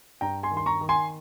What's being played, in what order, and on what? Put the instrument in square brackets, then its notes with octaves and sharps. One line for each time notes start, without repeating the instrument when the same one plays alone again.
[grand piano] G2 G5 A#5
G#5 C6
D#3
C6
A#5 C#6
D#3
G#5 C6